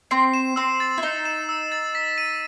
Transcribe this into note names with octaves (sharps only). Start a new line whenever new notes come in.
C4 C7
E7
C4 E6
A6
E4
D#4 C7
E7
E6
A6
B6
D#7